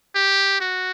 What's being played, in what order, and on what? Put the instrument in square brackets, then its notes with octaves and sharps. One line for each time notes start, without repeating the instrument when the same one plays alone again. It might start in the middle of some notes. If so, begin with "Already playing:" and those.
[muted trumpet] G4
F#4